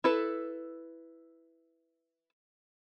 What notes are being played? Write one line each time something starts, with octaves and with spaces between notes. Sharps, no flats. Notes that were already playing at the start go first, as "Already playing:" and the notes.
E4 A4 B4